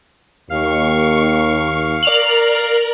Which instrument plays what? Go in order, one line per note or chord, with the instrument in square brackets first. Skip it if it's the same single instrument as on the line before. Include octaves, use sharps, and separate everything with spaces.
[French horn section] D#2 [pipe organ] F5 [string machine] C#6
[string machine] A#4 [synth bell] D5 F7 F#7